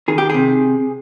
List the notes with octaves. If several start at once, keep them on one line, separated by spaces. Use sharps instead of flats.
D#3 G#4
G4
C3 G#4